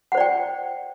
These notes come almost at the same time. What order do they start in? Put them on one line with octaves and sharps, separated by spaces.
F#5 C5 D5 G5